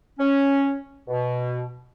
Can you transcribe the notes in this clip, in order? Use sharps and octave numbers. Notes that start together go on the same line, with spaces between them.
C#4
B2